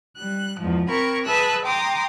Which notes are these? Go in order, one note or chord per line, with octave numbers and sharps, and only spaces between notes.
G3 F#6
E2 G#2 F3
C4 A#4 B5 C#6 G#6
G#4 B4 E5 A5 E6 F#6
G5 A#5 C6 D6 D#6